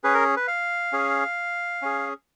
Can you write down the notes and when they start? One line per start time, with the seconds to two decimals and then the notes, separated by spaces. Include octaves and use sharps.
0.04 C#4 G#4 B4
0.14 A#4
0.37 B4
0.48 F5
0.93 C#4 G#4
1.82 C#4 G#4